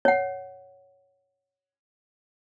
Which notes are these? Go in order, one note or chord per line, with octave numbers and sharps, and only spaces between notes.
C#5 F#5